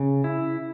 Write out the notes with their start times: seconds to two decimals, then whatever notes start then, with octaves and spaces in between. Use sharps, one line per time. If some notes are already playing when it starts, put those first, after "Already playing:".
Already playing: C#3
0.24 E4